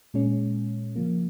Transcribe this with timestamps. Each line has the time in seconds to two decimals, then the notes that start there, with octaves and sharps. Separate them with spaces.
0.14 A#2 G#3 C#4
0.96 C#3 F3 A#3